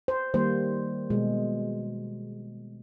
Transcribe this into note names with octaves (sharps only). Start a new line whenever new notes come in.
C5
D#3 G3 A#3 C5
B2 G#3